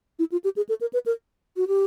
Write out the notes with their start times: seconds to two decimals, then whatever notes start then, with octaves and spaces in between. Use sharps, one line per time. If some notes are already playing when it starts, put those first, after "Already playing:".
0.19 E4
0.32 F4
0.44 G4
0.56 G#4
0.69 A4
0.81 A#4
0.93 B4
1.06 A#4
1.57 F#4
1.68 G4